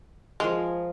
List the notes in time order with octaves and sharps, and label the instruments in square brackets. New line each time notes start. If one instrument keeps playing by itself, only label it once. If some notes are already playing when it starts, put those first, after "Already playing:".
[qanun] F3 G#4 A#4 [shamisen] G#3